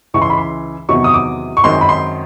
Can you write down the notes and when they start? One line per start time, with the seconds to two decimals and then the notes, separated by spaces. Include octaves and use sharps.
0.14 C#2 C#3 E3 C#6
0.22 C6
0.30 B5
0.38 C6
0.89 E2 C3 D#3 F#3 C#6
1.04 D#6
1.14 D6
1.57 C#6
1.64 F#2 D#3 G#3 C4 C6
1.81 B5
1.89 C6